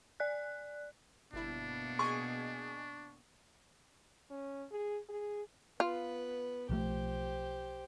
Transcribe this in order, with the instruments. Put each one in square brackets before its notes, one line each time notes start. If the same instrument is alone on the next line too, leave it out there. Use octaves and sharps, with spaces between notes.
[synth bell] D5 F#6
[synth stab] G1 E4 [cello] B2 A#3 [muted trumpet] D4
[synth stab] G#4 D#5 G#5 [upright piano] C#6
[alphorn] C#4
G#4
G#4
[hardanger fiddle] B3 B4 [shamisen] F4
[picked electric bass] B1 F3 A3 [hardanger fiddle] G4 C5